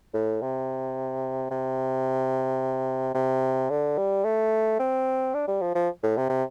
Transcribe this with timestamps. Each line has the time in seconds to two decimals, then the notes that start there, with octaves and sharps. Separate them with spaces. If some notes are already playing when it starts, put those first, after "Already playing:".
0.14 A2
0.42 C3
1.50 C3
3.14 C3
3.70 D3
3.98 G3
4.24 A3
4.79 C4
5.34 D4
5.47 G3
5.61 F3
5.75 F3
6.03 A2
6.17 C3
6.29 C3